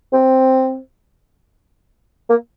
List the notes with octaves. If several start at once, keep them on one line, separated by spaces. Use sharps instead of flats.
C4
A#3